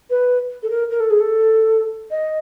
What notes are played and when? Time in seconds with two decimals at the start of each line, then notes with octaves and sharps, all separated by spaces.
0.10 B4
0.63 A4
0.70 A#4
0.90 A#4
1.00 A4
1.10 G#4
1.20 A4
2.11 D#5